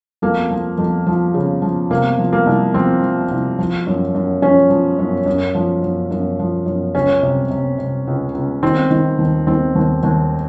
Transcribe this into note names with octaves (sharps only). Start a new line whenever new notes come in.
F2 A#3
F3
F2
F3
C#3
F3
C3 A#3
F3
A#3
C2
F3 C4
F3
C2
F3
F#2
F#2
F3 C#4
F3
F#2
F#2
F3
F#2
F#2
F3
F#2
C#2 C#4
C3
C3
C3
C#2
C#2
D#3 C4
D#3
D#2
D#3 C4
D#2
D#2